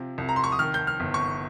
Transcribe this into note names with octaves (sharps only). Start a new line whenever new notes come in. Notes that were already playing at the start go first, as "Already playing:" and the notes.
Already playing: C3 F3
C2
A#5
C6
C#6
D#6
D#3 F6
G6
F6
G1
C#6